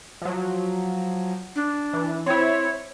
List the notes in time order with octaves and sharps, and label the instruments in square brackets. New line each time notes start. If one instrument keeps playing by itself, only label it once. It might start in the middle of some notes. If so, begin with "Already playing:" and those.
[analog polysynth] F3 F#3
[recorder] D4
[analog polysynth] E3
[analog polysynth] C4 E4 [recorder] C#5